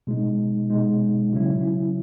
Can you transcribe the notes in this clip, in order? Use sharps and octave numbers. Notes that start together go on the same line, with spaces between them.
B2 G#3 D#4
B2 G#3 D#4
C#3 F#3 C#4 E4